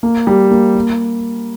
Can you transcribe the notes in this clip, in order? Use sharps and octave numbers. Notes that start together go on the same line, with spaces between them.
A#3
G3
A#3
A#3